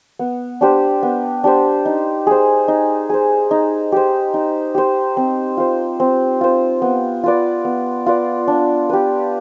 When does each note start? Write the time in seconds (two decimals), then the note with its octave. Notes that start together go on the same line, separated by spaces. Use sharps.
0.19 B3
0.61 D4 G4 C5
1.03 B3
1.44 D4 G4 C5
1.85 D#4
2.27 G#4 C5
2.68 D#4
3.10 G#4 C5
3.51 D#4
3.92 G4 C5
4.34 D#4
4.75 G4 C5
5.17 C4
5.57 F4 C5
6.00 C4
6.41 F4 C5
6.82 B3
7.24 F4 B4 D5
7.65 B3
8.06 F4 B4 D5
8.48 D4
8.90 G4 B4